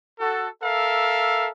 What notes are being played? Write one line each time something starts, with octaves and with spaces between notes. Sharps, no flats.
F#4 A4
A4 A#4 E5 F5